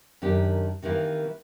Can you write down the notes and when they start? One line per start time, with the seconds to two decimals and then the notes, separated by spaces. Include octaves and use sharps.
0.22 F#2 D#3 D4 G4
0.82 C3 D#3 E3 A#3